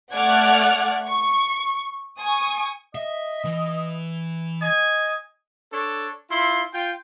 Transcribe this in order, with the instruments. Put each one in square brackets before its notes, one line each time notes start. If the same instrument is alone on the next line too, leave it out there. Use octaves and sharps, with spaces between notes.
[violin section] A3 D5 F#5 F6 F#6 G#6
C#6
G#5 C#6 D#6
[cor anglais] D#5 [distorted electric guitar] E5
[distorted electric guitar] E3
[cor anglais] D#5 [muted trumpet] G#5
[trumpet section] D4 A4 C#5
E4 F4 C6
F4 G5